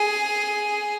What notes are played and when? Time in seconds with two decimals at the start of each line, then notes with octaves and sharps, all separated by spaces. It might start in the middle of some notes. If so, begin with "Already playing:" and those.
Already playing: G#4